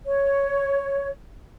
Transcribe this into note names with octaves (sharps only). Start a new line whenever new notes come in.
C#5